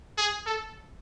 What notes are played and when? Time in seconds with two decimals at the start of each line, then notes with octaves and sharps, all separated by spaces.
0.18 G#4
0.47 A4